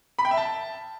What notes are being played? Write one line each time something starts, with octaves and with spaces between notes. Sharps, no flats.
B5
G5
E5
A5